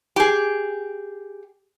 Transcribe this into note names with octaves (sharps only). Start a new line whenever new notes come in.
G4 G#4